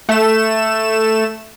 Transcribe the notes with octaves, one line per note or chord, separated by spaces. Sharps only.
A3 E7